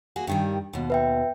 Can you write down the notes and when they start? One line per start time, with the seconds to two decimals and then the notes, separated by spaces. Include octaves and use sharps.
0.16 A#3 F#4 G#4
0.27 G2 D#3 G3
0.73 D#2 B2
0.90 B4 E5 G5